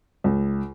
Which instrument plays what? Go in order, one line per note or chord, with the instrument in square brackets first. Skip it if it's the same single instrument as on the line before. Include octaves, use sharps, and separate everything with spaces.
[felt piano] C#2